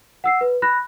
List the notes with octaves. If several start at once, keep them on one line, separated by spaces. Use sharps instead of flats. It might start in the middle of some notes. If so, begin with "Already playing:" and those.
F#5 E6 C7
B4
B5 F#6 A#6